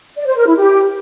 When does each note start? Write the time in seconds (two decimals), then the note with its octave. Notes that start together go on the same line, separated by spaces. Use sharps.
0.17 D5
0.27 C5
0.37 A#4
0.47 E4
0.57 G4